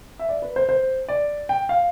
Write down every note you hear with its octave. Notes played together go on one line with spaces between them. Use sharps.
E5
D5
B4
C5
C5
D5
G5
F5